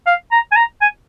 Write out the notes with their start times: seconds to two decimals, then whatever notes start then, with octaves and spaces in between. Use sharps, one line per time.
0.07 F5
0.32 A#5
0.52 G#5
0.56 A#5
0.82 G#5